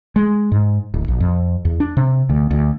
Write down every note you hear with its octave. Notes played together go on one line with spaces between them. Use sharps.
G#3
G#2
D1
A#1
F2
E2
D4
C3
D2
D2